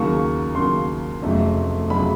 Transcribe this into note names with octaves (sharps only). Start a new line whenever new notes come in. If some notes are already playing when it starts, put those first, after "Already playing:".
Already playing: D#2 C#3 F#3 A#3 C#6
D#2 C#3 F#3 A#3 C6
F1 F2 C#3 F#3 A3
F1 F2 C#3 F#3 A3 B5